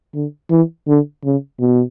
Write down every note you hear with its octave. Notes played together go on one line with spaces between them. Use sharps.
D3
E3
D3
C#3
B2